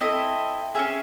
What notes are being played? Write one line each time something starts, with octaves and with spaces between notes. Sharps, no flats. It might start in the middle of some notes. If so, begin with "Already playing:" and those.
C4 E4 A4 D#5
C#4 F4 G#4 E5